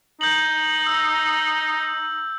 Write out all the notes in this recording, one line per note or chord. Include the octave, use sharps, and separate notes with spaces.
D#4 G6 F#7
E6